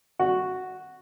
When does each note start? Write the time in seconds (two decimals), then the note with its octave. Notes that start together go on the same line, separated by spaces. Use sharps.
0.19 F#4